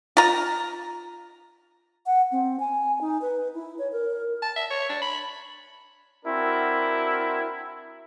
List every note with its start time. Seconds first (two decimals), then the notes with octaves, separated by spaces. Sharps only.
0.17 F4 A#5
2.06 F#5
2.32 C4
2.60 G#5
3.01 D#4
3.21 B4
3.54 E4
3.78 C#5
3.92 A#4
4.42 A5
4.56 E5
4.71 C#5
4.89 D4
5.02 B5
6.25 C4 D4 E4 F#4 A#4